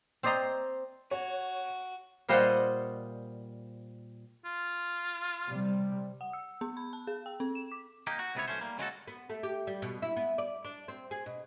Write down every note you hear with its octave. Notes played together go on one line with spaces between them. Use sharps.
C4 C5 D5 D#5 A#5 C6
F#4 C#5
A#2 G3 F4 C5 D#5 F#5
F4
C3 G3
F#5
E6
B3
B5
A5
G#4
G5
C4
E7
D6
A#3 D#4 G4
F#4
C#2 C3 A#3 B3 E4 C#5
B1 A3 C#4 C5
G3 A#3
C#3 G#3 F4 F#4 A4
B3
A3
G4
G3
B2
E4
B3
D5
D4
C4
G#4
B2